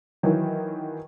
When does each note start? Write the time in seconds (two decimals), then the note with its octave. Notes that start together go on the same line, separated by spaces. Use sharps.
0.23 D#3 E3 F#3